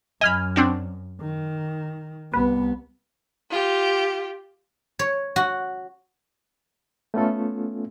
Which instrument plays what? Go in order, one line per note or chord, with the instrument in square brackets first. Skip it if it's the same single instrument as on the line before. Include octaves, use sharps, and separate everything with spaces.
[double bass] F#2 [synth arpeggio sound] D#5 B5 [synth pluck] G#5 F6
[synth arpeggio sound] C4 D4 F#4
[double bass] D#3
[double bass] C2 B3 [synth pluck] B4
[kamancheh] F4 G4
[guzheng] C#5
F#4
[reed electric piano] A3 B3 C#4 F4 A4